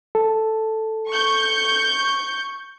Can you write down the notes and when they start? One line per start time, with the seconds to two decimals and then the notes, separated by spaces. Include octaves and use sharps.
0.15 A4
1.09 C#6 G6